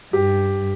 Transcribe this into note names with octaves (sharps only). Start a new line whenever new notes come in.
G2 G4